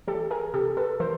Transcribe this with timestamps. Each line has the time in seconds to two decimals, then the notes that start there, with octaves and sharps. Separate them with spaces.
0.07 E3 G4 A4
0.31 G#4 A#4
0.54 C3 G4 A4
0.77 A4 B4
1.00 E3 A#4 C5